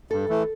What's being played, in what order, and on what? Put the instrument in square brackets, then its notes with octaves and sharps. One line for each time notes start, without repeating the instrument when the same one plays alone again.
[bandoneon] G2 [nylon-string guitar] A4
[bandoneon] E3 A3